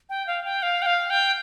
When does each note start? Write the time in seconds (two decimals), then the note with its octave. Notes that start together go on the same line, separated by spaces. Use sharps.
0.09 G5
0.27 F5
0.45 G5
0.63 F5
0.82 G5
0.86 F5
1.10 G5